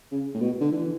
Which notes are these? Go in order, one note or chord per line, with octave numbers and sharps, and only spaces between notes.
C#3
A2
B2
D3
E3